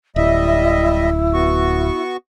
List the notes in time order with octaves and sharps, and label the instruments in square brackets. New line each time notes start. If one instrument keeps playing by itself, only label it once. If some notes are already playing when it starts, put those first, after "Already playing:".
[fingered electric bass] D1 [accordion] G3 D#5 E5 [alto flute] E4
[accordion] B3 F#4 C#6